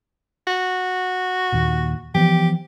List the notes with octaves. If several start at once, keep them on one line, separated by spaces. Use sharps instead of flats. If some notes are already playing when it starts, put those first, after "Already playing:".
F#4
D#2 A#2
E3 F3 B3 G4